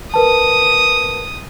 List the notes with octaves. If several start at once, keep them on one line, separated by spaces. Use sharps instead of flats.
A#4 B4 A5 D#6